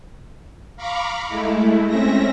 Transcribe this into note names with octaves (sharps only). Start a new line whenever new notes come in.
F5 A#5 B5 C#6 D6
G#3 A3 E4
C4 C#4 E5 A#6